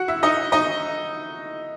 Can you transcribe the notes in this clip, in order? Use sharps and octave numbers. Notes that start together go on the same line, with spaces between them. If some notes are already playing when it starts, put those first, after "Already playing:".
Already playing: F#4 F#5
E4 E5
D#4 D#5
D#4 D#5